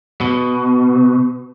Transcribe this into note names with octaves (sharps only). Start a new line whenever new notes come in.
B2